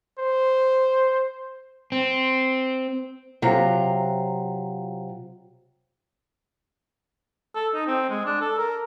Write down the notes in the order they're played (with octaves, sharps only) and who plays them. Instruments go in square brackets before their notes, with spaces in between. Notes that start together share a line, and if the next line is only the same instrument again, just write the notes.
[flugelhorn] C5
[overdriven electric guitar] C4
[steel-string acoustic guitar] C3 F#3 F4 A#5
[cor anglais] A4
D#4
C4
G#3
D4
A4
A#4